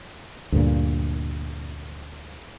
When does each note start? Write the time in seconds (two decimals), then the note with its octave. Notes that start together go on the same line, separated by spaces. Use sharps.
0.52 D2 G2 A#2